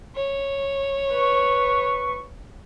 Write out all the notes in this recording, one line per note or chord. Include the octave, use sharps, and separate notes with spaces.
C#5
B4 C#6